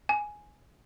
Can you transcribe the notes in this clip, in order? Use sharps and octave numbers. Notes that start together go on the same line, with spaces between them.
G#5